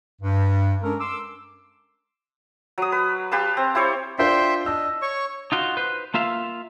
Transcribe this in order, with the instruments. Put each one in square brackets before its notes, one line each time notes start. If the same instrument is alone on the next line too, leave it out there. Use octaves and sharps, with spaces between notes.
[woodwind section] G2
G#3 C#4 D4 A4 A#4
C6 D6 E6
[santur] F#3 D#6
B4
G4 B4 F5 A5
C4
E4 G4 C5 C#5
[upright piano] D4 F4 C5 [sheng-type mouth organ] E5 G5 C6
[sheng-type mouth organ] D4 D#5 [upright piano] E6
[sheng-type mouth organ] C#5 C#6
[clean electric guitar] D#4 F4 F#4
B4 C5
A#3 F4 E5 F5